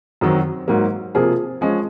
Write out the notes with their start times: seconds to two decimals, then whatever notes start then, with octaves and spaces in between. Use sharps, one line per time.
0.21 F#2 D#3 F#3 C4
0.68 G#2 F#3 A#3
1.15 C3 F3 A#3 F4 G#4
1.61 F3 G#3 C#4